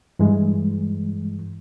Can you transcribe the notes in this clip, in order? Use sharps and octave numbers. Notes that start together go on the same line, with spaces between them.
G2 E3 G#3